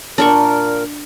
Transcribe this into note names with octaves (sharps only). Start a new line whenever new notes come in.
A#2 D4 A#4 G5 C#6